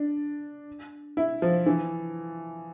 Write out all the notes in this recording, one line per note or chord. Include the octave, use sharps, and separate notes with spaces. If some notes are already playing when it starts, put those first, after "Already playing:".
Already playing: D4
E4
F3
E3